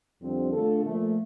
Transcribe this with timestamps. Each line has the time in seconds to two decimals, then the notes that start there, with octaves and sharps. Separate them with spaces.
0.21 F2 D3 G3 C4
0.52 D3 A3 D4 F4 A4
0.84 A#2 F3 A3